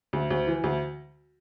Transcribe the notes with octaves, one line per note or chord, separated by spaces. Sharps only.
D2
D2
E3
D2